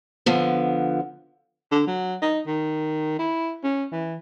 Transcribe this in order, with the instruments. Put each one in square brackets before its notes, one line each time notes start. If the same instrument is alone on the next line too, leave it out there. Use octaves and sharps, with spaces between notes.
[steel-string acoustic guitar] D3 F3 B3
[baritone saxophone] D3
F#3
D#4
D#3
E4
C#4
E3